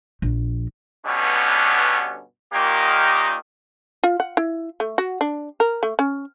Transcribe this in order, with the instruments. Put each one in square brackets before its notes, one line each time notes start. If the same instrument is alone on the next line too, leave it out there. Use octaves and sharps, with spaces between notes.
[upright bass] A#1
[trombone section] G2 B2 D3 B3 C#4
A#2 D#3 A#3 D#4 G4
[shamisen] F4
F#5
E4
A3
F#4
D4
A#4
A3
C#4